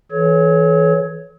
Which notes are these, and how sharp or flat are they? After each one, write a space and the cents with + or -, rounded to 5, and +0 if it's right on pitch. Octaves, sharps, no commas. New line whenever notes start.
E3 +0 A4 -45 C#5 +0